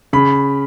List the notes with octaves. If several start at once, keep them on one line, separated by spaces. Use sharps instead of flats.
C#3 B5